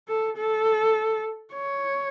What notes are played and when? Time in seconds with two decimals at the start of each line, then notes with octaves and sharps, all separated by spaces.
0.08 A4
0.37 A4
1.54 C#5